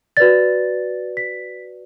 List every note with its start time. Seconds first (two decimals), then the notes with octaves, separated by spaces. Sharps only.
0.17 F#4 B4 D5 A6
1.17 B6